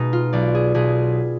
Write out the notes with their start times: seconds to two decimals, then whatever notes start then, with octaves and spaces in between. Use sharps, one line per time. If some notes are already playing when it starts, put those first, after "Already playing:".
Already playing: B2 G#3 D#4
0.13 F4
0.33 B1 D5
0.55 G#4
0.75 B1 G#4